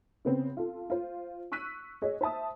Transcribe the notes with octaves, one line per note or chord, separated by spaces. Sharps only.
C#3 B3 C4
F4 A4
F4 C5
C#6 E6 F#6 B6 D#7
G#4 C#5 D#5
C5 E5 A5 D#6